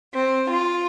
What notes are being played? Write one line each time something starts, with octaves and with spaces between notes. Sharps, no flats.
C4
F4